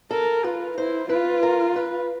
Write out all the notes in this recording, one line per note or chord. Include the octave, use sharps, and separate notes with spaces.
A4 A#4
F4 B4
E4 C5
F4 B4
A#4
B4